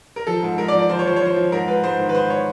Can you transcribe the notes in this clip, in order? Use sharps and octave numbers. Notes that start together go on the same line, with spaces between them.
A#4
F3 A4
G#2
G#2 A#4
D5
F3
D5
F3 C5
C#5
F3 C5
C#5
F3 C5
F3
G#2 A#4
G#2 B4
G#2 C5
D#3
B4
G#2 C5
C#5